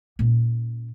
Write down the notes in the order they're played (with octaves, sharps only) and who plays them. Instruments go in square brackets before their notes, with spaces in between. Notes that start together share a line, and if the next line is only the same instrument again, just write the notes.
[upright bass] A#2 C#4